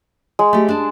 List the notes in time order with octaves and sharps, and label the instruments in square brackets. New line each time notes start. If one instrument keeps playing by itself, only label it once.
[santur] G#3
[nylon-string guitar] A3 G4
D4 A5